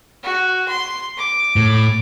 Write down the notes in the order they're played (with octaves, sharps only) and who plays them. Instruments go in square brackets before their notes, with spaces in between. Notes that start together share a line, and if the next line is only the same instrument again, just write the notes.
[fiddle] F#4
C6
D6
[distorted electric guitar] A2